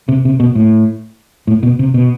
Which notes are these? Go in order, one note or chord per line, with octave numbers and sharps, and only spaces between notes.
C3
C3
B2
A2
A2
B2
C3
B2